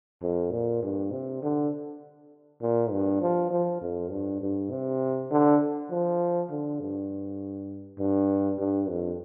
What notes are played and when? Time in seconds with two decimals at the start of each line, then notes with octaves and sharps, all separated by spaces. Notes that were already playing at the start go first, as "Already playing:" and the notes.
0.22 F2
0.52 A#2
0.82 G2
1.11 C3
1.42 D3
2.61 A#2
2.91 G2
3.21 F3
3.51 F3
3.81 F2
4.10 G2
4.41 G2
4.70 C3
5.31 D3
5.90 F3
6.50 D3
6.80 G2
7.99 G2
8.59 G2
8.89 F2